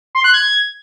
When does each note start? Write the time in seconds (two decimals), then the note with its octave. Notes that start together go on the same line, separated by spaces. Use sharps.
0.15 C6
0.24 F#6
0.34 G#6